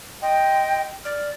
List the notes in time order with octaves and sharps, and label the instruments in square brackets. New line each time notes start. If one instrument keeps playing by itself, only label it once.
[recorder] D#5 [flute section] G5 C6 G6
[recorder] D5 [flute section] F6